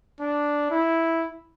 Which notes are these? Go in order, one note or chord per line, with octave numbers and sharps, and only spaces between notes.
D4
E4